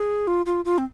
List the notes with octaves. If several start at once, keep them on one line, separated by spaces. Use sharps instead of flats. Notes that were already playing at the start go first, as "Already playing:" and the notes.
Already playing: G#4
F4
F4
F4
C4